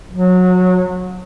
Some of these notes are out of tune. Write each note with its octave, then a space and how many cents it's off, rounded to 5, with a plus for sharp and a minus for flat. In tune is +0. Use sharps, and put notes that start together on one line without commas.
F#3 -25